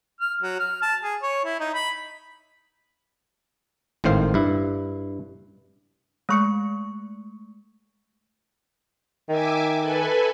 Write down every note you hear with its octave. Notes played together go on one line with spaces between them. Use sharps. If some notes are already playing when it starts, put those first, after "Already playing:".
F6
F#3
F6
A5
G#4
C#5
E4
D#4
B5
G#1 A2 D#3 C5 F5
G2 E4
G#3 A3 C#6 C#7
D#3 E5 G#5 D6
A4 B4 G#5